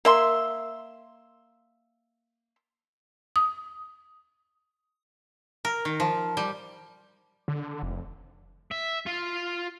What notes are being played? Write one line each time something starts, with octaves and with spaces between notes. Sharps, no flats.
A#3 E5 C6
D#6
A#4
D#3
F3
G3
D3
F1
E5
F4